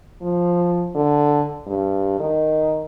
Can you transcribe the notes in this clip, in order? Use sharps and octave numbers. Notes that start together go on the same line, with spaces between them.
F3
D3
G2
D#3